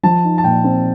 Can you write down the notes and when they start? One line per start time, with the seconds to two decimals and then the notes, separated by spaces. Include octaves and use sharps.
0.03 F3 A5
0.24 D#4
0.38 A5
0.44 A#2 G5
0.64 C4